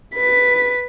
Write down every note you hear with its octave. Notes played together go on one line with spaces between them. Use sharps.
B4 B6